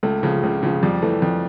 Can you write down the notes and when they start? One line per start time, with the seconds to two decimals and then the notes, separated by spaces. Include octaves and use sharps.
0.03 C#2 A3
0.23 C#3 F3
0.43 C#2
0.63 C#3 F3
0.83 F2 G3
1.02 E3 A3
1.22 F2